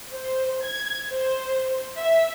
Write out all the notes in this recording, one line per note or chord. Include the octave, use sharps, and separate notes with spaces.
C5
G#6
C5
E5